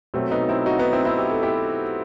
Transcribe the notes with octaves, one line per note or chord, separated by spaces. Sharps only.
B2 F#3 A3 C4
B3 D#4
C4 E4
D#4 F#4
B3 D#4
C4 E4
C4 E4
G4
A4
E4 G4